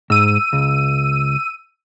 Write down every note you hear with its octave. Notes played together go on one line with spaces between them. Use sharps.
G#2 E6 D#7
C#2